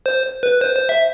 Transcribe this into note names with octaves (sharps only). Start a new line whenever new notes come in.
C5
B4
C5
C5
E5